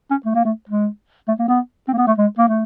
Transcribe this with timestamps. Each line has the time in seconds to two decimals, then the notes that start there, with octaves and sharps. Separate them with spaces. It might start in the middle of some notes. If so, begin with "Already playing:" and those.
0.11 C#4
0.26 A3
0.35 A#3
0.45 A3
0.69 G#3
1.28 A3
1.39 A#3
1.48 B3
1.88 C4
1.93 A#3
1.98 B3
2.07 A3
2.18 G#3
2.38 A#3
2.48 A3